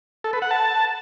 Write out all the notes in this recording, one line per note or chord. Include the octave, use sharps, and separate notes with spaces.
A4
B4
F#5
A5